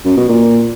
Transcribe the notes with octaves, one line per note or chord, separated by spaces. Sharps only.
F#2
B2
A#2